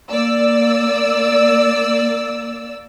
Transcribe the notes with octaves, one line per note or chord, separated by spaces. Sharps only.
A#3 D5 E6